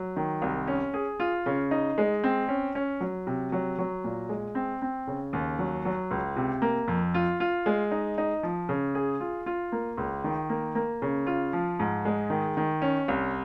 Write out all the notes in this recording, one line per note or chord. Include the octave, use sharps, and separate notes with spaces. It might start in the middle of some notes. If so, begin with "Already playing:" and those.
Already playing: F#3
D#3
C2
C#4
G#4
F4
C#3
D#4
G#3
C4
C#4
C#4
F#3
C3
F#3
F#3
A#2
G#3
C4
C4
C#3
D#2
F#3
F#3
C#2
C3
A#3
F2
F4
F4
G#3
D#4
D#4
F3
C#3
G#4
F4
F4
A#3
C#2
D#3
A#3
A#3
C#3
F4
F3
G#2
G#3
D#3
D#3
C#4
C2